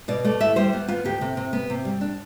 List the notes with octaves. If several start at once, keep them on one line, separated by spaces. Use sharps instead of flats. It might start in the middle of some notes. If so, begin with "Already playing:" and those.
B2 D5
A3 D5
E4 E5
G3 C5
B3
B3 F4
D2 G4
C3
C3
B3
C3
G3
D4